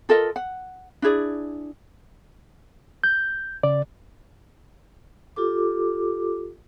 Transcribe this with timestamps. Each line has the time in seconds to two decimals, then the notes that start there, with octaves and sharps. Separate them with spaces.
0.09 F4 A4 A#4 D#5
0.36 F#5
1.02 D4 E4 G#4 D5
3.04 G6
3.63 C#3 D5
5.36 F4 G4 A4 D6